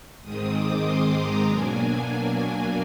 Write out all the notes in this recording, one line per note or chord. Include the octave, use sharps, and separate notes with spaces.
G#2 D#3 G#3 C4 D#6
D6
C6
A#5
B2 F#3 A#3 D4 G#5
G#5